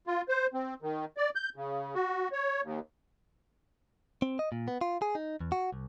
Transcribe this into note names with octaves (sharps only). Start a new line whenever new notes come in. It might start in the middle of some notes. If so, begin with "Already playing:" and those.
F4
C5
C4
D#3
D5
G6
C#3
F#4
C#5
D#2
C4
D#5
A#2
B3
F4
G#4
D#4
E2
F#4
C2